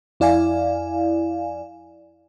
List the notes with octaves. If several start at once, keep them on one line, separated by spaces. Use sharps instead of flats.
F2 E4 D5 F5 G#5